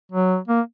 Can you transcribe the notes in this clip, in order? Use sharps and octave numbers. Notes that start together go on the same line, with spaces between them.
F#3
A#3